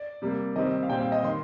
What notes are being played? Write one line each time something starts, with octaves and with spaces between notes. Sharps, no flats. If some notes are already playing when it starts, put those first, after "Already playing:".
Already playing: D5
C3 G3 A#3
C3 D#3 G3 C4 D#5
F5
A#2 G3 C4 G5
F5
D#5
D#3 C6